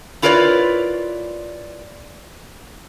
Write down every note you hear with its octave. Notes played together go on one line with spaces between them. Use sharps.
E4 F4 A#4 B4 C#5 D5